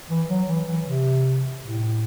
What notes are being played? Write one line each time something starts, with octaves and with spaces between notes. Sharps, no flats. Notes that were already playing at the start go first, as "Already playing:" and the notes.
E3
F#3
E3
E3
C3
A2